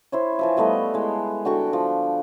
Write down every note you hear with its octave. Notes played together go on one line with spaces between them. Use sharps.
E4 C5 C#5
E3 F3 E5
G3 A3 B3 D#5
G#3 E4
D3 F#4 G5 C#6
F3